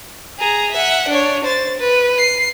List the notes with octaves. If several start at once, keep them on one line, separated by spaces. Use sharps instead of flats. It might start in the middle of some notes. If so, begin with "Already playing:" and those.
G#4 A#5
E5 F#5
D4 C#5
C5 A6
B4
C7